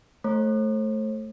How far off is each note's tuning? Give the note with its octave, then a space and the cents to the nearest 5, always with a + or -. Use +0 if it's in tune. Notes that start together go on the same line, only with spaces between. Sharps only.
A3 -10 C5 +45